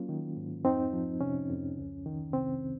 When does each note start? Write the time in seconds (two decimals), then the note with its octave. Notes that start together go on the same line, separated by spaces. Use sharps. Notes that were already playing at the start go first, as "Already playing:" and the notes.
Already playing: F#3 A#3 C#4 F4
0.09 D#3
0.37 G#2
0.65 F2 C4 D#4
0.93 F3
1.21 C3 C#4
1.50 F2
1.77 C#2
2.06 D#3
2.33 C3 C4